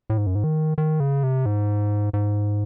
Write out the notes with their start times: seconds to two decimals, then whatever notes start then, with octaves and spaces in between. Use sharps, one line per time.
0.10 A2
0.18 G#2
0.27 F#2
0.35 G#2
0.44 D#3
0.78 D#3
1.00 C#3
1.23 C3
1.46 G#2
2.13 G#2